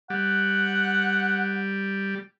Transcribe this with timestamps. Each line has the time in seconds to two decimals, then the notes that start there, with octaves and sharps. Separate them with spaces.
0.10 G3 F#5